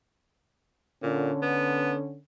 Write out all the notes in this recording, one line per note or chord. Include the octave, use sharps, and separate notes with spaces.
A#2 D3 C#4
B3